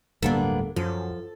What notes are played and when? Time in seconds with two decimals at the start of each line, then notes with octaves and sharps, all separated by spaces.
0.22 D1 D2 G2 A#3 B3 D4 A4
0.76 F#2 F3 A4